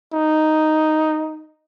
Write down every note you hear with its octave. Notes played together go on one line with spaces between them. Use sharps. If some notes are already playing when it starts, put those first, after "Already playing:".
D#4